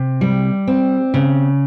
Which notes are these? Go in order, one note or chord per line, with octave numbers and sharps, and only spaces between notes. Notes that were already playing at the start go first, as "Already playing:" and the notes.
Already playing: C3
G3
C4
C#3